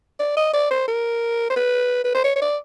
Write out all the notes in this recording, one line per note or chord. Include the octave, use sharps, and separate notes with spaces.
D5
D#5
D5
C5
A#4
C5
B4
B4
C5
C#5
C#5
D5